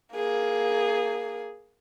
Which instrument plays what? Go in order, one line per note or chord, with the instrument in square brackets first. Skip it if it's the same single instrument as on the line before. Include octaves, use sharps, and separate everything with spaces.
[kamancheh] A#3 G#4